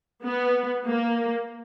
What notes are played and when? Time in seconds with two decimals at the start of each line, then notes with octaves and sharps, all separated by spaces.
0.24 B3
0.87 A#3